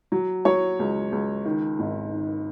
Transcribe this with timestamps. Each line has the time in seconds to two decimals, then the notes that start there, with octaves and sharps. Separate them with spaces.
0.12 F#3
0.45 F#3 C#5
0.79 C#2
1.12 C#2
1.45 D#3
1.79 G#1
2.12 D#3